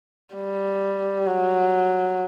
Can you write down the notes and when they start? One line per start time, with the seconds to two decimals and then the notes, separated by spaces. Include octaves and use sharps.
0.36 G3
1.26 F#3